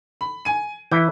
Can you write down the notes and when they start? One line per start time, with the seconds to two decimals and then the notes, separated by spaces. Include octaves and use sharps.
0.21 B5
0.45 G#5 D#7
0.91 E3 E4 G6